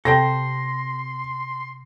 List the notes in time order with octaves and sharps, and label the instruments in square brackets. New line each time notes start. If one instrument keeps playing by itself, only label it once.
[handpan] C3 [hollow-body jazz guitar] A4 C5 G5 [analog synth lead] C6 [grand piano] A#6